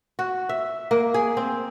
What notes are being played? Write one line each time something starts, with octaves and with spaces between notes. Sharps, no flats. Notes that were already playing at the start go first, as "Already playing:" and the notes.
F#4
E5
A#3
G#4
C4